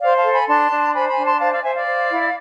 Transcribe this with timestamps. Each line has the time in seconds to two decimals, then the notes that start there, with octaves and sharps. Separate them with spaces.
0.01 C5 D5 F5
0.16 F5 A5
0.24 A4
0.32 G#5 B5
0.48 D4 A5 C6
0.71 D4
0.94 C5 G#5 B5
1.09 G#5 B5
1.17 D4
1.25 A5 C6
1.40 C5 F5 A5
1.52 D5 F5
1.63 C5 E5 G#5
1.75 D5 F5
1.87 C5
2.10 E4